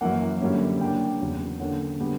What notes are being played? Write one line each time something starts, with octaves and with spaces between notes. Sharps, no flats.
F#2 E3 A#3 F#5
F#2 D3 G3 A#3 C#4
C#3 G3 A#3 D4 G5
E2 C#3 F#3 C#4
D3 A#3 C#4 F#5
D3 G3 B3 D4